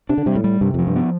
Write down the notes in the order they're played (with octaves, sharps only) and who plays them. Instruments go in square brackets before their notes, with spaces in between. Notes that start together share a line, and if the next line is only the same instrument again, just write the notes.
[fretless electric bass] C3 [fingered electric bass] D4
[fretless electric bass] D3
[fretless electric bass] C3 [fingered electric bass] G3
[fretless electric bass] A2
[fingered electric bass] G3
[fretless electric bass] G2 [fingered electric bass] C3
[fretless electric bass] F2 [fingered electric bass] F3
[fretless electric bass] G2
[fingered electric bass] B3